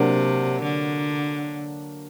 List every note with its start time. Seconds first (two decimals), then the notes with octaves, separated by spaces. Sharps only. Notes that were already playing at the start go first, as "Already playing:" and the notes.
Already playing: C3 F#3 A#3 D4
0.63 D3